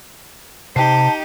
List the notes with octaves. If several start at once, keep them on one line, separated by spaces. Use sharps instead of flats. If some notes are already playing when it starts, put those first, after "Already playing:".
C3 D#4 G4 C5 A5